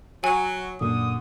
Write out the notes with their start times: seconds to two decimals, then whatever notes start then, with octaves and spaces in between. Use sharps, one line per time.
0.24 F#3 G#5
0.81 F#2 A#2 D3 D#6